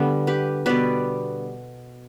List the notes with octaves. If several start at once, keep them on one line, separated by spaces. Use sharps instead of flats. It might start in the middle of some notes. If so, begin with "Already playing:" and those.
Already playing: D3 G3 B3
G4 B4
B2 G3 B3 B4 D5